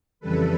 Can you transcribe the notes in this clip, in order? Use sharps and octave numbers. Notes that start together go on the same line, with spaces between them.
F2 C#3 E3 G3 A4 B4